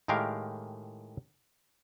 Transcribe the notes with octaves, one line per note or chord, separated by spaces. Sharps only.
A2 D#3 G#3 G4 A#4 F5